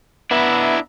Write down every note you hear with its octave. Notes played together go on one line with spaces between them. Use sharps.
B3 D4 E4 E5 A#5